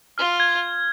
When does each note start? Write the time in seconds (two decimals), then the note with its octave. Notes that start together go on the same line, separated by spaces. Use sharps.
0.18 F4 F6
0.40 G#6